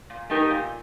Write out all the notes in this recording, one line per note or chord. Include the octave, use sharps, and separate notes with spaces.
A#2
A3 D#4 G4 A#4
A#2